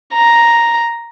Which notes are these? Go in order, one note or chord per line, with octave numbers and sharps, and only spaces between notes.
A#5